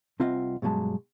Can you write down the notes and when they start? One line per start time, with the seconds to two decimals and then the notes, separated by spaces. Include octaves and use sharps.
0.20 C2 C4 F4 D#5 E5 F#5
0.62 G2 B2 F#3 G#3 A5